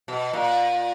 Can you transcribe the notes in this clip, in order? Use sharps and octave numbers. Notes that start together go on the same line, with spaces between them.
B2
A#2